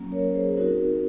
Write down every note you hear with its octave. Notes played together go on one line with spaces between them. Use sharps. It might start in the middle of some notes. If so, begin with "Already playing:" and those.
Already playing: F#3 A#3 C#4 F4
A#4 C#5
G#4 C5
C4 D#4 F#4 A#4